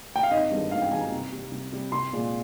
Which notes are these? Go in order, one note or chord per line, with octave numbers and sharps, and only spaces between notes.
G5
F5
G#1 D#5
G2 D#3 G#3
G#1 F5
G5
G2 D#3 G#3 G#5
A#5
C2
C3 G3
C2
C3 G3
C2 C6
A#2 G#3